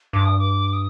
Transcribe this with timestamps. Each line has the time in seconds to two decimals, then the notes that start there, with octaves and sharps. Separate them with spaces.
0.13 G2 D6
0.25 D#6
0.39 D6
0.73 D#6